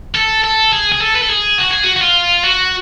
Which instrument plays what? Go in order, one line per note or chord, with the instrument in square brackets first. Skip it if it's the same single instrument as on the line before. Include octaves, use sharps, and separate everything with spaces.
[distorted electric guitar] A4
A4
G#4
G#4
A4
B4
A4
G#4
F#4
G#4
F#4
F#4
F4
F#4